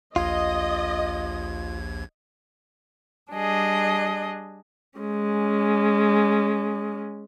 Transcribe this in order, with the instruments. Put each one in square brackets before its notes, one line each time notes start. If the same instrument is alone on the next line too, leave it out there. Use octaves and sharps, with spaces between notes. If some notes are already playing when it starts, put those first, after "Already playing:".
[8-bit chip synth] A#1 D#2 G#6 [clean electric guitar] F4 [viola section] D#5
[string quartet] G3 D4 G#4 D#5
[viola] G#3 C#4